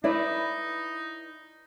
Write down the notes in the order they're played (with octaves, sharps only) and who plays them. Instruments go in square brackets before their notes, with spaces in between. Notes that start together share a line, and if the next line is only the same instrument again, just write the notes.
[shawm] D#4 [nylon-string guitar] E4 B4 D5